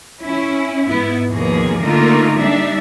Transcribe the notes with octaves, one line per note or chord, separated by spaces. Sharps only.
C#4 E4
G#2 B3 E4
D#2 B2 F3 A#3 G#4
D3 A3 A#3 D#4 F4 A#4
G3 D4 D#4 E5